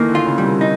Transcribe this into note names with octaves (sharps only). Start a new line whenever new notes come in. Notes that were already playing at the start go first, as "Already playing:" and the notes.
Already playing: D#3 E3 A3 A#3
D3
F4
C#3
G3
C3
D#4